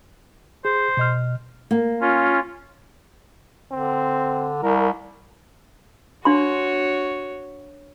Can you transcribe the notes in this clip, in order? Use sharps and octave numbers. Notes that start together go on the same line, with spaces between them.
G#4 C5
B2 D#5 F6
A#3
C#4 F4
D3 C4
C2 A#4
D4 F#4 C#5 C6